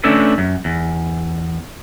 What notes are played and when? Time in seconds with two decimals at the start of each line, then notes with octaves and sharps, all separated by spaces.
0.04 A3 C#4 D4 E4 A4 B4
0.38 F#2
0.65 E2